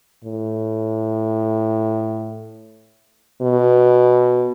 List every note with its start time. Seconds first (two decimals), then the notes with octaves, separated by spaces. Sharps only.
0.24 A2
3.42 B2